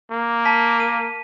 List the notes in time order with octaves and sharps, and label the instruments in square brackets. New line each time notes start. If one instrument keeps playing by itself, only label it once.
[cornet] A#3
[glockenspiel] A5 B6
D#7